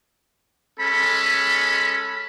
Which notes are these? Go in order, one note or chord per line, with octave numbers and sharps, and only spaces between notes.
G#3 C#4 A4 B5